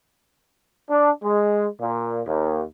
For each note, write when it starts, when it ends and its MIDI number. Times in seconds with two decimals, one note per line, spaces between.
0.90 1.11 62
1.23 1.66 56
1.80 2.22 46
2.26 2.63 39